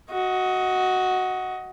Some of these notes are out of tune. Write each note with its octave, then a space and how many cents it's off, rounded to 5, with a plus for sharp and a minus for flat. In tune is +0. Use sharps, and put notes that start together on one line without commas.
F#4 +0 D#5 +20